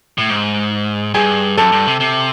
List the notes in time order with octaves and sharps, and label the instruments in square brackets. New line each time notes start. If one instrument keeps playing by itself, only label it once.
[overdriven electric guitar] A2
G#2
[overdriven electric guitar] G2 [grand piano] G#4 G#5
[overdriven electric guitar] F#2 [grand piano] A4 A5
[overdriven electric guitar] G2
C3
C3